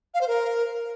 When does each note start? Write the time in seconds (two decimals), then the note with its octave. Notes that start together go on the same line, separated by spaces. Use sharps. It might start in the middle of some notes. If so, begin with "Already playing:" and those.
0.14 F5
0.21 C5
0.28 A#4